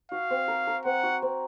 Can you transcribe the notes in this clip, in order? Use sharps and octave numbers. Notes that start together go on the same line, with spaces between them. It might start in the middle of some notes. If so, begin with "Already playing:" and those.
F#4 F5
C4
A#4
A#4
C4 F#5
F#4
C4